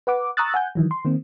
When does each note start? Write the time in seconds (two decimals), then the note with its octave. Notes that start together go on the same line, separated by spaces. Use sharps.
0.07 B4 F#5 D6
0.37 A#5 C#6 D#6 E6 F#6 A6
0.54 F#5 G#5 G6
0.75 D#3 E3 F#3
0.91 C6
1.05 D#3 A#3 C4